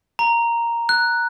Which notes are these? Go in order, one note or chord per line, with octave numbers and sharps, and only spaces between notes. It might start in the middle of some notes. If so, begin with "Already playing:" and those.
A#5
F#6